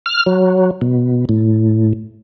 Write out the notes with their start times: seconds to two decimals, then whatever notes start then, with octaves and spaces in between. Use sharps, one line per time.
0.06 F6
0.26 F#3
0.81 B2
1.29 A2